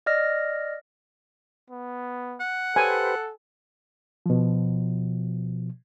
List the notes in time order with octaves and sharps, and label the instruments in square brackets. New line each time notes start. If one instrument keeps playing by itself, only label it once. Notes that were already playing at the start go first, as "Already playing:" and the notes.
[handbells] D5 D#5 F6 A#6
[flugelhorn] B3
[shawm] F#5
[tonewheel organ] G4 B4 C5 [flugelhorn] A4 [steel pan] G#5
[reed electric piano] B2 F3